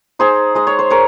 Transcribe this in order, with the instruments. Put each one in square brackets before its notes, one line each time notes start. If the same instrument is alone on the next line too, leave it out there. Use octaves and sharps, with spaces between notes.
[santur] D#4 G#4 C5
G#3 D#5
C#5
C5
G#3 A#4 C#5